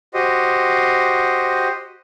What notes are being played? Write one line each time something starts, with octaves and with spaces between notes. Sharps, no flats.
F#4 G4 C5 D#5